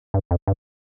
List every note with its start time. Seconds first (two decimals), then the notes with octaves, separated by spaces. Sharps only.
0.14 G2
0.31 F2
0.47 G2